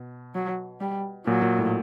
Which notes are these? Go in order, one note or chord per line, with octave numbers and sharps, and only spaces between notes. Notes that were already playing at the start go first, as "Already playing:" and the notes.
Already playing: B2
F#3
G3
A#2 F#3
A#2
A2